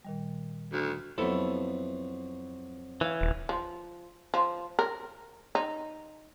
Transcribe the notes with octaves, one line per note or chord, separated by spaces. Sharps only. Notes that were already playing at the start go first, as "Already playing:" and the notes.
A#2 D#3 G3
D2
F2 F#3 B3 E4 A4
E3 C#5 F5
D#1
F3
F3
A#4
D#4